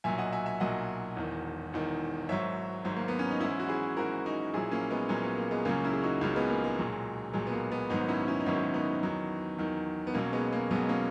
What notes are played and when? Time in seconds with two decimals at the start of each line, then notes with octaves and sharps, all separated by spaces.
0.04 B1 A#2 F#3 E5 G#5
0.18 D#5 F#5
0.33 E5 G#5
0.46 E5 G#5
0.60 B1 A#2 F#3 D#5 F#5
1.16 E1 E2 D#3
1.73 E1 E2 D#3
2.29 G#1 G#2 F#3 C#5 E5
2.85 G#1 G#2 F#3
2.96 A#3
3.08 B3
3.19 C#4
3.30 D#4
3.41 G#1 G#2 E3 C#4 E4
3.59 F#4
3.69 E4 G#4
3.97 G#1 G#2 E3 F#4 A#4
4.26 D#4 F#4
4.53 A#1 A#2 F#3 E4 G#4
4.71 A#3 C#4
4.91 G#3 B3
5.09 A#1 A#2 F#3 C#4
5.24 B3
5.38 A#3
5.51 G#3 B3
5.65 C#2 C#3 F#3 A#3 C#4
5.84 C#4 E4
5.93 G#4
6.03 D#4 F#4
6.21 C#2 C#3 F#3 C#4 E4
6.36 G#3 B3
6.50 A#3
6.64 G#3
6.78 B1 A#2 F#3
7.33 B1 A#2 F#3 G#3
7.47 B3
7.53 A#3
7.72 G#3 B3
7.90 G#1 G#2 D#3 F#3 B3 D#4
8.08 C#4 E4
8.28 C#4 E4
8.40 D#4
8.46 G#1 G#2 D#3 F#3 C#4 E4
8.74 B3 D#4
9.03 E2 D#3 F#3
9.58 E2 D#3 F#3
10.07 B3
10.14 B1 B2 F#3 A#3 C#4
10.33 G#3 B3
10.53 A#3
10.71 B1 B2 F#3 G#3 B3
10.89 A#3 C#4